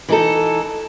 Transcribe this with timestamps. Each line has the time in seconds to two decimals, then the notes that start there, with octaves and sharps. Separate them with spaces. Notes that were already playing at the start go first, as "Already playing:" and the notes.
0.09 E3 D#4 A4